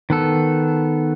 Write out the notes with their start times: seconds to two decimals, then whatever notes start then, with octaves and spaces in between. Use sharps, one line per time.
0.10 D#3 B3 A4